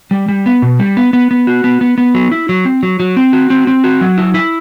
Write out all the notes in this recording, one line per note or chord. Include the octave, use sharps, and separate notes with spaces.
G3
G3
B3
B2
G3
B3
B3
B3
F#4
B3
B3
B3
F#3
E4
F#3
C4
F#3
F#3
C4
F#4
C4
C4
F#4
F#3
E4
E4